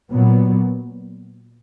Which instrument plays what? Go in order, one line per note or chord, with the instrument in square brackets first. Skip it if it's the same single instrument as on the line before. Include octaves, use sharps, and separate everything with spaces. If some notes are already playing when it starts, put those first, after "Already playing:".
[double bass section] A#2 F#3 B3